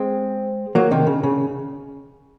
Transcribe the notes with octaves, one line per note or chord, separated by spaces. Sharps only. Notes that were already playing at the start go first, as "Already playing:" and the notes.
Already playing: G#3 C4
F#3 A#3
C3 D#3
C#3
C#3